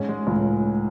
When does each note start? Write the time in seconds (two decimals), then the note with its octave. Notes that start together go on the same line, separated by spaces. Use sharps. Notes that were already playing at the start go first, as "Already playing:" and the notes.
Already playing: G#2 C#4
0.09 G#3
0.27 C#2 A2